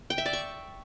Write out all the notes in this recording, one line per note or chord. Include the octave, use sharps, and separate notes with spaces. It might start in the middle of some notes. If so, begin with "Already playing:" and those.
G5
E5
D5
C#6